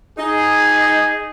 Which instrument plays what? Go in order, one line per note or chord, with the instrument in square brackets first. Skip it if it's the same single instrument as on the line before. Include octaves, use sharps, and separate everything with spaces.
[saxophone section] D#4 [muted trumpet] G#4